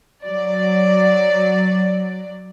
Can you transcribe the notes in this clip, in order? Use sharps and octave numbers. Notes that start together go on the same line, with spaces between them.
F#3 D5